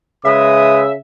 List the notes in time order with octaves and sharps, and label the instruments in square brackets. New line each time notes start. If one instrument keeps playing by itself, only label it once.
[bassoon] C#3 [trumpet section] G#3 B4 D#6 [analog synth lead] E5